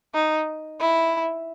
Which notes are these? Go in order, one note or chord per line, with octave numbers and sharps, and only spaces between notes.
D#4
E4